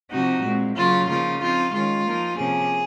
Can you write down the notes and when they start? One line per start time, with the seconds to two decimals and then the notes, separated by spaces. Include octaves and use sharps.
0.11 C3 F3 C4 D#4 F#4
0.43 A#2 G#3 C4
0.76 C#3 F#3 A#3 F4
1.08 C#3 F3 A#3 D#4 F4
1.40 F3 C4 D#4 F4
1.73 D#3 G#3 C#4 F4
2.05 F3 A#3 D#4
2.37 C3 F3 A#3 C#4 G#4